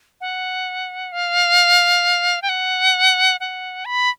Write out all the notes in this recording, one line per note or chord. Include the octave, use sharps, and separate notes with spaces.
F#5
F5
G5
F#5
F#5
B5